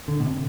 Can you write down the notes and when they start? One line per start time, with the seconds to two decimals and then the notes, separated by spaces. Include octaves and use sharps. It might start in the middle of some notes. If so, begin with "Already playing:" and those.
0.08 D3
0.20 B2
0.26 C3